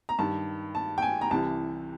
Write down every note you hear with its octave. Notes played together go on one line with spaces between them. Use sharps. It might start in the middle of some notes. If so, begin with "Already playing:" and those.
A#5
G2 D#3 A5
A5
G5
G#5
A#5
C2 C3 E3 A5